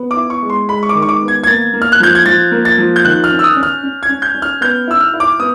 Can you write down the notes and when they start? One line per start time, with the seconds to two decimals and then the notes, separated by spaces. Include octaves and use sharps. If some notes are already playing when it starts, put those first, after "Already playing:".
Already playing: B3
0.11 D6
0.17 E4
0.30 C#6
0.42 G#3
0.50 C6
0.69 G#3 B5
0.83 C#6
0.89 D6
0.95 D#3
1.02 C#6
1.09 D6
1.22 B3
1.28 G#6
1.44 G#6
1.47 A#3 A6
1.74 A#3
1.82 F6
1.92 F#6
2.00 F3 G6
2.15 G#6
2.26 F3 A6
2.52 A#3
2.65 A6
2.78 F3
2.96 G6
3.05 D#3 F#6
3.24 F6
3.31 C#4
3.39 E6
3.44 D#6
3.57 C#4
3.63 F6
3.83 C#4
4.03 G#6
4.09 C#4
4.22 G6
4.35 C#4
4.42 F6
4.61 B3 G6
4.88 E4 E6
5.00 F6
5.14 E4
5.20 D6
5.39 B3 D#6